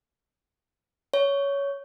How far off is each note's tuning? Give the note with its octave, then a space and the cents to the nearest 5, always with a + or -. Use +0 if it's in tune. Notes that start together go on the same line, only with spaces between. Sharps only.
C#5 +15